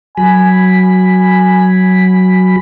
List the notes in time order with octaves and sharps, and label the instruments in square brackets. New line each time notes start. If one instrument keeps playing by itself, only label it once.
[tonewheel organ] F#3 B5 [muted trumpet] G#5